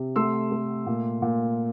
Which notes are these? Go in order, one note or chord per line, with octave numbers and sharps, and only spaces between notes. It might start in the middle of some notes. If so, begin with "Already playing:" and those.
Already playing: C3
A3 C6 E6
A3
A#2
A#2